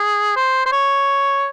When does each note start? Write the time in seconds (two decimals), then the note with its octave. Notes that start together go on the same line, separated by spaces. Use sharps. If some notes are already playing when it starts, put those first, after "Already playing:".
Already playing: G#4
0.36 C5
0.66 C5
0.72 C#5